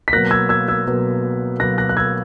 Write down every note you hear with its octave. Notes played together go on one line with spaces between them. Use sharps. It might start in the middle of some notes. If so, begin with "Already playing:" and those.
B6
B2 F#3 A#3 F#6 A#6
E6 G#6
E6 G#6
E6 G#6
B2 F#3 A#3
B2 F#3 A#3 F#6 A#6
F#6 A#6
F#6
E6 G#6